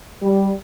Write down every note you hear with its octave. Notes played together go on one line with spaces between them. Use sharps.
G3